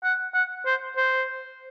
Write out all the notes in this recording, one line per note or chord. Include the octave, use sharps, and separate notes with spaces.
F#5
F#5
C5
C5